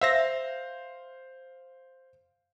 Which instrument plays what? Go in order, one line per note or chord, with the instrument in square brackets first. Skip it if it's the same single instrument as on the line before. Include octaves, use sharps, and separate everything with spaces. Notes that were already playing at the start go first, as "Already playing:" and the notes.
[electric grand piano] C5 F5 [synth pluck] E5 A#6